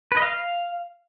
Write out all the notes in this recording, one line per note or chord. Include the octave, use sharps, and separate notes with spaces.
B4
D#5
F5